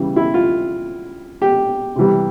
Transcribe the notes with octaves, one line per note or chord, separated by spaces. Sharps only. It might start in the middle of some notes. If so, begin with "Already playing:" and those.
Already playing: C#3 E3 G3
E4
F4
G4
C3 E3 G3